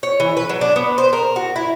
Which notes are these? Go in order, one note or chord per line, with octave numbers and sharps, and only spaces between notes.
C#5
E3
B4
F#3
D4
B3
C5
A#4
F#4
E4